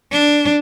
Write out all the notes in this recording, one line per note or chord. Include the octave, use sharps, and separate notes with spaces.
D4